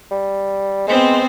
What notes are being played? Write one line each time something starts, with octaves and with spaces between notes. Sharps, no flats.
G3
G#3 B3 C4 C5